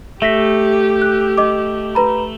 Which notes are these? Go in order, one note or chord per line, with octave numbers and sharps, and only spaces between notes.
A3 G4 E5 A#6 B6
F#6
D#5 D6
B4 A#5 B5